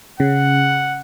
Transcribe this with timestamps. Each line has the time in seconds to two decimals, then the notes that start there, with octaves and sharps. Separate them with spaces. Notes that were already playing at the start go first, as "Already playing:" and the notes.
0.20 C#3 F#5